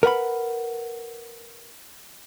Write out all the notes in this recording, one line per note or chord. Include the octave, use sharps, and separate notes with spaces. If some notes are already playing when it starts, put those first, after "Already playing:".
A#4 B4 F#5 B5